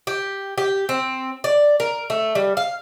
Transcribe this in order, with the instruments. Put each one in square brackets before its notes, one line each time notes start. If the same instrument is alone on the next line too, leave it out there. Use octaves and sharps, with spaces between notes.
[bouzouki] G4
G4
C4
D5
A#4
A3
G3
F5